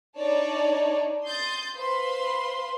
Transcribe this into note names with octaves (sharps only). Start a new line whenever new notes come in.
D4 D#4 C#5 D5 A5
C6 D#6 G6 A6
B4 C5 F5 B5 C6